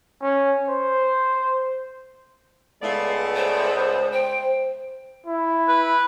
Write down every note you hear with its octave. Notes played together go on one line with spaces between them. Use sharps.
C#4
C5
C#2 G#3 A3 B3 D5 F5
C5
C5 G5
E4
B4